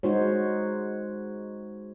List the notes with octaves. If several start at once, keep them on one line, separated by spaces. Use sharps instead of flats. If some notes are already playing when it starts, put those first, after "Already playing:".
G#3 D#4 F#4 C5 C#5